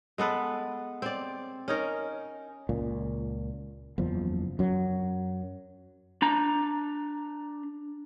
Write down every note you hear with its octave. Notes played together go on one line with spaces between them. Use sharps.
G#3 B3 A4 B4
C4 D5
C#4 D#4 A#4
C#2 A#2
F#1 E2 F3
F#2 F#3
D4 A#5